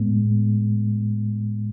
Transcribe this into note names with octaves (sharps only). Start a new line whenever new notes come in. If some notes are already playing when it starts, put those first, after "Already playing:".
Already playing: A2 G#3 B3